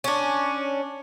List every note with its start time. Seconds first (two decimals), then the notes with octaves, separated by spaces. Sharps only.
0.04 C#4 D4